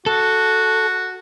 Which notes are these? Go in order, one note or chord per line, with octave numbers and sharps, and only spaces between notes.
F#4 A4